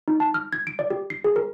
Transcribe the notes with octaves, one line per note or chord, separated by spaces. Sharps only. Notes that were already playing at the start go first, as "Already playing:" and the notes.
D#4
A5
F6
G#6
D7
D5
G4
C7
G#4
A#4